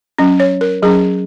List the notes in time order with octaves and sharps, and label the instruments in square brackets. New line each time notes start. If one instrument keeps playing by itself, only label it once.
[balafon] F#3 C#4
C#5
A#4
F#3 C#4 G#4